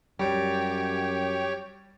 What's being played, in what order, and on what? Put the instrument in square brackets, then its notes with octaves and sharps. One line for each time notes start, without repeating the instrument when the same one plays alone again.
[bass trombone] F#2 [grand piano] G3 [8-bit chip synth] G4 G5 [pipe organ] C#5